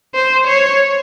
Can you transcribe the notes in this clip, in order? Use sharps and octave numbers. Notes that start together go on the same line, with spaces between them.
C5
C#5